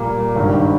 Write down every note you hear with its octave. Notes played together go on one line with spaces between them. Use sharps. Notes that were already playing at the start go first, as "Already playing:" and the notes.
Already playing: A#2 G3 A#3
G#1 G2 D#3